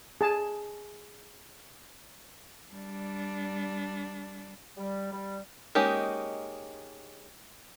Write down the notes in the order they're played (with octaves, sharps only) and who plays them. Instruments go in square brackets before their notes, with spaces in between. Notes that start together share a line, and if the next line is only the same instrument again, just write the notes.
[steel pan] G#4 A5
[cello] G3 D4
[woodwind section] G3
G3
[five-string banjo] G#3 A#3 C#4 D#4 G4